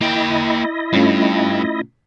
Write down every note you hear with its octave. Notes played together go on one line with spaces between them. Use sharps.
A#3 E4 D#5 G5
G2 A3 C#4 F4